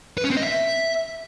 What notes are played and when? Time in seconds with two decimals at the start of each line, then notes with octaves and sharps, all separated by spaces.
0.18 B4
0.24 C#4
0.30 C4
0.37 D#5
0.43 E5